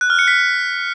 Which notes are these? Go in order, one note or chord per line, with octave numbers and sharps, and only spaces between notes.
F#6
F6
C#7
B6